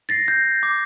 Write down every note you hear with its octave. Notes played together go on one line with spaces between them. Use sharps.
A6 A#6 C7
G6
D6